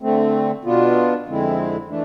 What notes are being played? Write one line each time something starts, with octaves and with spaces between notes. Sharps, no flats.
D3 A3 C4
B2 B3 D4 F4
F2 D3 G#3 C4 E4
E3 A3 D4